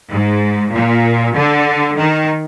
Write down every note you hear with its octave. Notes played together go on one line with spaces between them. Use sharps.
G#2
A#2
D3
D#3